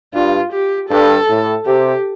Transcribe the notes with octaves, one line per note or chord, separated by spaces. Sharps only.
G2 F4
G4
G2 A4
A2
C3 G4